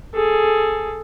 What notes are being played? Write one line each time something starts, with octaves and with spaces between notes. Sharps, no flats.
G#4 A4